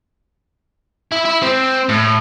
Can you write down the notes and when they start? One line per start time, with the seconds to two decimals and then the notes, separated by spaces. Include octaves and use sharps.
1.12 E4
1.25 E4
1.42 C4
1.89 A2